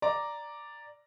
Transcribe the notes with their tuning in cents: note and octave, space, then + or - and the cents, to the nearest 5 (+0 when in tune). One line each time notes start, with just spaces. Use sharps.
D5 +0 A#5 +0